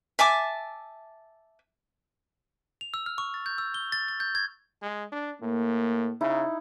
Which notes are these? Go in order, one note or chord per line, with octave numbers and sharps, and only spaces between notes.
E5 G#5 A5 D6
F7
E6
F6
C#6
A6
G6
E6
G7
A6
A6
G6
G#6
G#3
D4
A2 A#3
C#3 D#4 E4